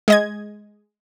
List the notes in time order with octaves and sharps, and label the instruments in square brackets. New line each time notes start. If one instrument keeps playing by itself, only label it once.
[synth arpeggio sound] G#3 D#5 G#6